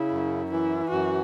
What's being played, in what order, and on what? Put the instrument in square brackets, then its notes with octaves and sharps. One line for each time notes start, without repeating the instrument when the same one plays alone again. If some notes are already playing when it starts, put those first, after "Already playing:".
Already playing: [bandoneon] C#3 [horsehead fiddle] E4
[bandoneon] F#2
[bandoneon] E3 [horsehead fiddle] E4
[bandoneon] F#2 [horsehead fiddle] F#4